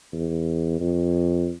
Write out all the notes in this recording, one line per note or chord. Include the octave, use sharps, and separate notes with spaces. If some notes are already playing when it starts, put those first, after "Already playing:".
E2
F2